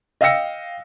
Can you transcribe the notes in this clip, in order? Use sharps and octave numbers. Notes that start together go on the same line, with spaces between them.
D#5 F5 G5 E6 A#6 C#7